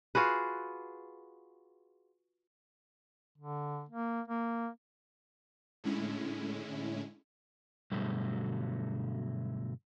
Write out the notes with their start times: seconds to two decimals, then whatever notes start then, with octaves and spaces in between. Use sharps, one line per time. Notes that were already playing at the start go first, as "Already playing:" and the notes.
0.15 F4 F#4 G#4 B4
3.38 D3
3.89 A#3
4.28 A#3
5.84 A2 D3 G#3 C#4 E4
7.92 G2 B2 D3 F#3 G3 A3